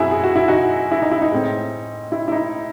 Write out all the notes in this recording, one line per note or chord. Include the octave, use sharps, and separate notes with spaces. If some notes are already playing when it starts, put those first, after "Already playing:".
Already playing: F#2 G#3 C4 E4 F#4 G#4
G#4
F#4
E4
D#4 F#4
E4
D#4
E4
D#4
A2 G#3 C4
E4
E4
D#4